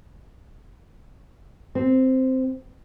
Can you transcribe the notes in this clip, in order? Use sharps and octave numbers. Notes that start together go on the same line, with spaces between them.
C4